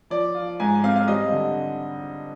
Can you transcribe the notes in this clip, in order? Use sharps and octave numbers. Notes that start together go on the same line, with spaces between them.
F3 D5
F4
G#2 G#5
C4 F5
F5
G3 D#5
D3